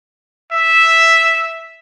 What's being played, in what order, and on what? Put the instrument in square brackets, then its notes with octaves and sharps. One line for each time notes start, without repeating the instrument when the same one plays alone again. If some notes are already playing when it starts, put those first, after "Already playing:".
[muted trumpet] E5